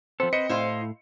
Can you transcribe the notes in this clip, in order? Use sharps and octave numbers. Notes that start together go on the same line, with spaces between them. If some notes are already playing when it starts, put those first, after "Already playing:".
F3 B3 C4 A4
B4 C5 D#5 C#7
A2 E4 C5 F5